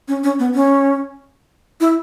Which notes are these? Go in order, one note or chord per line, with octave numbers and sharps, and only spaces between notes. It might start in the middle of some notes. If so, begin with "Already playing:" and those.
C#4
C#4
B3
C#4
E4